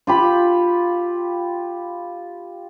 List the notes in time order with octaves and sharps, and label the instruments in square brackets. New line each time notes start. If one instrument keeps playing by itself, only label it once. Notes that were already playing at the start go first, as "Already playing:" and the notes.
[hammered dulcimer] F4 G4 B5